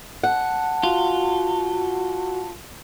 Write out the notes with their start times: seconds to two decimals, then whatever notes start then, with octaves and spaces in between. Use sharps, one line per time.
0.23 F#5 A5
0.83 F4 F#4